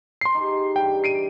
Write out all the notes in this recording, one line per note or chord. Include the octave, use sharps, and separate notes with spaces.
C6 C7
D#4 G4 G#4
G2 E3 G5
C7 D7 D#7